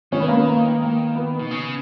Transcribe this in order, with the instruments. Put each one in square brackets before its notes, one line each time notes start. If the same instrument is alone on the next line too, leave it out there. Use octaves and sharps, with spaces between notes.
[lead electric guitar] D#3 [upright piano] C#4
[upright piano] B3
A#3
B3
A#3
A#3
B3
[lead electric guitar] B2
C#3